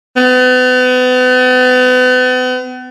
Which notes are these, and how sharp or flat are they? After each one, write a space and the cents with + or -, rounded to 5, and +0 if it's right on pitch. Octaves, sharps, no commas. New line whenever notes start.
B3 +40